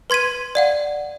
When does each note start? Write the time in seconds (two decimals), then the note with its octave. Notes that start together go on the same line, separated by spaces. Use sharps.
0.10 B4 C6 G#6 B6 D#7
0.55 D5 F5 F#5